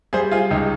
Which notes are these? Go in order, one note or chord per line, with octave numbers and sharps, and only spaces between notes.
G3 G#4 C5
F4 G#4
C#2 D#4 G4